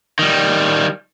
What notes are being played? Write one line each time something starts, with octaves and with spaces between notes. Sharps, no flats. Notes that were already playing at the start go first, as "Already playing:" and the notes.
D#3 G3